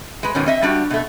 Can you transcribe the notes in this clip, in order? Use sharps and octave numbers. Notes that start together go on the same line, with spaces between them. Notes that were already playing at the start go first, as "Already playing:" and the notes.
G#3 B4
G#2 B2 D#3 C#4
C4 D#5 E5
G3 D4 F#4 G4
B2 A3